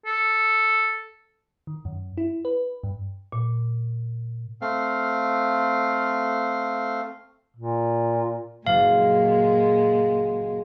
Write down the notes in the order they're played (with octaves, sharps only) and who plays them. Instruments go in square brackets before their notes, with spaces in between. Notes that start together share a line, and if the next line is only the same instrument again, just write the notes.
[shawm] A4
[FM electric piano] D#3
F#2
E4
B4
G2
[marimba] A#2
[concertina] A3 C4 F5
[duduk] A#2
[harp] F#1 [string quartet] A#2 G#3 [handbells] F5